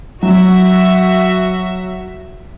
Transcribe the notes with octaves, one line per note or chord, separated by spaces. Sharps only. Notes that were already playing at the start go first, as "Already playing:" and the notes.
F#3 F#4 E5